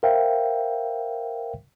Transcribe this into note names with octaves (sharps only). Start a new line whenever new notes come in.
A#4 C5 E5 F5 G5